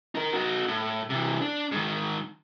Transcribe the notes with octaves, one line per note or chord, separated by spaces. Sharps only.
D#4 A#4
D#4 F#4
A2
C3 E3
D4
G#2 D#3